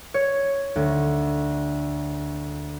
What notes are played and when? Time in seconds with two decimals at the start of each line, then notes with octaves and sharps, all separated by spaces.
0.14 C#5
0.76 D2